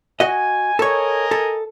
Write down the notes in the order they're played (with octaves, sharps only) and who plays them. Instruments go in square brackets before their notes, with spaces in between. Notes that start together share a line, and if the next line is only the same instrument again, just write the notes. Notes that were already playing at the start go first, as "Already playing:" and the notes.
[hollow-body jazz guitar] F#4 D#5 [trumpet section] G#5
[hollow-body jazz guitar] A4 C#5 [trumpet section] A#4 D#5 G#5
[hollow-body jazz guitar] A4